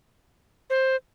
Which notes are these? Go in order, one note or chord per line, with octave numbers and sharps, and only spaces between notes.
C5